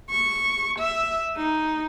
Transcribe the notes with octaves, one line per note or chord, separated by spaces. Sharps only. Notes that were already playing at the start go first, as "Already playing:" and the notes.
C#6
E5
D#4